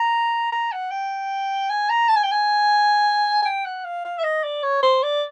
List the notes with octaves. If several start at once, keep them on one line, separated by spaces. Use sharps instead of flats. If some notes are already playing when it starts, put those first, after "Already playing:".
Already playing: A#5
A#5
F#5
G5
G#5
A#5
A5
G#5
G5
G#5
G#5
G5
F#5
F5
F5
E5
D#5
D5
C#5
C5
D5